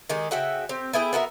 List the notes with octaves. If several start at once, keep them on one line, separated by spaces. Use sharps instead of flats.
D#3 G#3 G4
C#3 F#4 E5 G5
C4 G4
B3 E4 G#4 G5
B3 F#4 A#4 E5